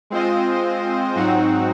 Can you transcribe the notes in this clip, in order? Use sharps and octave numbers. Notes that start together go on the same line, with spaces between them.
G#3 C4 F4 C5 D#5
G#2 F#3 C4 D#4 F#4